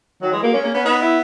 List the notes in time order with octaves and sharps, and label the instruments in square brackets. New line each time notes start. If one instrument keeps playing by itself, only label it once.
[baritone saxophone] D#3 [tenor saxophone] F#3
[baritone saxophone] E3 [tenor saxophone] G#3
[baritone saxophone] F#3 [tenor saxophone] A#3
[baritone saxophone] G#3 [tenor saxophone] C#4
[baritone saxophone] A#3 [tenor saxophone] C#4
[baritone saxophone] B3 [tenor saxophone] C#4
[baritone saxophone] B3 [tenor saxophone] D#4
[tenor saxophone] E4